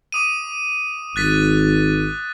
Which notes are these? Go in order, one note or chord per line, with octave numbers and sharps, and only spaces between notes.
D6 D#6 D#7
G#1 F#6 A6 B6